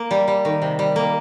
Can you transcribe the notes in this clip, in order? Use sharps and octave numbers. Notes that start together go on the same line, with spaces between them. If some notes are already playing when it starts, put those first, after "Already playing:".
Already playing: A#3
G3
G3
D#3
C3
G3
A#3